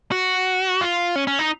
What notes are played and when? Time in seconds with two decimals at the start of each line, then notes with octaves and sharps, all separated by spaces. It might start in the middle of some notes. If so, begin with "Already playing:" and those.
0.12 F#4
0.81 F4
1.16 C#4
1.27 C#4
1.39 D#4